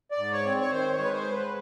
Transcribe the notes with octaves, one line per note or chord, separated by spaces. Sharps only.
D5
G#2
C#5
C4
C#5
D#3 C5
C#5
G#3
B4
C5
G#2
B4